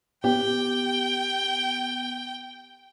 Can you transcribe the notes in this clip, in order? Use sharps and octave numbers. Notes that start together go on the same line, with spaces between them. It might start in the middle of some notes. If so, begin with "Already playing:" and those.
B3 G4 G5